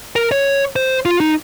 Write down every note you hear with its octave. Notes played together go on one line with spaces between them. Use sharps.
A#4
C#5
C5
F4
D#4